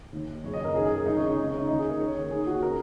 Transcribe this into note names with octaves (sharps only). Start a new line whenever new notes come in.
D#2 D#3
F#2 C#3 C#5
D#5
A#4
F#2 D#3 G#4
G#4
G#4
C#2 C#3 D#4
C#4
D#4
C#2 C#3 C#4
C#4
D#4
D#2 D#3 D#4
G#4
A#4
D#2 D#3 C#5
D#2 D#3 G#4
F#4
C#3 A#4